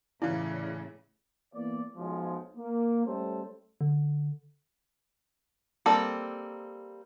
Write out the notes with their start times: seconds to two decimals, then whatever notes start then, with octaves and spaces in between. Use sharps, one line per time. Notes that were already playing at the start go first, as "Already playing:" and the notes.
0.22 A2 C#3 E3 E4 F4 D5
1.54 E3 A#3 B3 D5
1.96 B1 F3 G#3
2.57 A#3
3.05 G3 A3 C#4 A4 C5
3.81 D3
5.86 G3 A#3 C4 A4